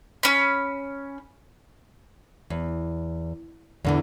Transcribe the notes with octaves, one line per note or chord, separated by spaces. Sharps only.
C#4 B5
E2
E2 D3 E3